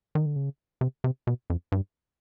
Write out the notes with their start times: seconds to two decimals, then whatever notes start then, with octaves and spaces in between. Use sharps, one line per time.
0.15 D#3
0.26 D3
0.36 C#3
0.81 C3
1.04 C3
1.27 B2
1.50 F2
1.72 G2